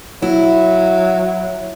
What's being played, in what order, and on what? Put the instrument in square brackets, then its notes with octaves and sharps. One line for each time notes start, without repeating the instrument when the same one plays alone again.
[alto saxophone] F#3 [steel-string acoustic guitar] E4